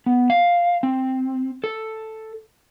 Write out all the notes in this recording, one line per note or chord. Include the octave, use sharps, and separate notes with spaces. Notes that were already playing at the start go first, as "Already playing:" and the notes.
B3
F5
C4
A4